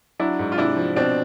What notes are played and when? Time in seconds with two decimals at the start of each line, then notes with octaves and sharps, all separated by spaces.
0.20 F#3 D4 E4
0.39 G#2
0.52 F4
0.57 C3 D4 E4
0.76 F3
0.96 B2 C4 D4